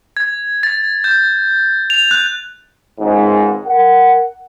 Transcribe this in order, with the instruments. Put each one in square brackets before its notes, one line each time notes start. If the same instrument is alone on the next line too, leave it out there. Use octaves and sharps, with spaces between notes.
[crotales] G#6
A6
G6
F7
F#6
[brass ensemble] G#1 C#2 G#2
A#4 F#5